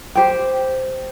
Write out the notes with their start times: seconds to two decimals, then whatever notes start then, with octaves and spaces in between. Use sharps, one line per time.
0.15 G4 C5 G5